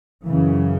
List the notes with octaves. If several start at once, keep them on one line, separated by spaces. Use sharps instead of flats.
F#2 C#3 E3